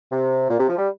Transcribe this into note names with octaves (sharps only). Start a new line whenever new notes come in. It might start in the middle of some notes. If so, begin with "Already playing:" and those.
C3
A#2
C3
F3
G3